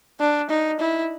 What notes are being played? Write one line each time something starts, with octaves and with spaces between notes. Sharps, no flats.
D4
D#4
E4